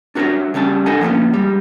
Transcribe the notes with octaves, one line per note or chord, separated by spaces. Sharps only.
D4 F#4 A#4 B4 C#5 E5
C#3 G3 C#4 A5
D4 A4 A#4 D#5 F#5 G#5
F3 A#3 B3 C#4
G#2 G3